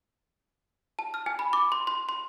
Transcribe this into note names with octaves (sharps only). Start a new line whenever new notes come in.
A5
F6
G#5
B5
D6
C6
C6
C6